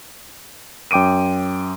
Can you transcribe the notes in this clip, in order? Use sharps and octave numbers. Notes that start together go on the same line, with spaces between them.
F#2 G5 D6 D7 D#7